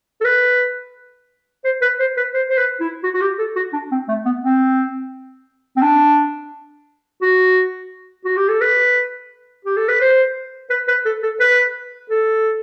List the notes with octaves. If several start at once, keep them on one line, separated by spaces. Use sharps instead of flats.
A4
B4
C5
B4
C5
B4
C5
C5
B4
E4
F#4
F#4
G4
A4
F#4
D4
C4
A3
B3
C4
C4
D4
F#4
F#4
G4
A4
B4
G4
A4
B4
C5
B4
B4
A4
A4
B4
A4